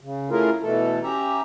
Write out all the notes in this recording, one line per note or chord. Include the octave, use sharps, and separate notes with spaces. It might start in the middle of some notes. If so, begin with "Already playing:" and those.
C#3
A3 C#4 E4 F4 G#4 A#4
B2 E3 A3 A4
C#4 G4 E5 A#5